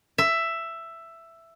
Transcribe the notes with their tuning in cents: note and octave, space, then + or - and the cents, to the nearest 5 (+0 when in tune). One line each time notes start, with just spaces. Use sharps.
E5 +10